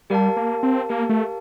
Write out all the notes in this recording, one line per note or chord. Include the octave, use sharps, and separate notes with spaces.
G3 G4 A#4 F5 A5
A#3
C4
A#3 G4 A#4 F5 A5
A3